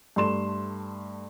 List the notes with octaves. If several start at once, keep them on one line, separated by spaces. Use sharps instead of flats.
G2 A3 C6 E7